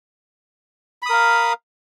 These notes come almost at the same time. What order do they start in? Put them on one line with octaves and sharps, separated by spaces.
B5 D#6 A#4 F5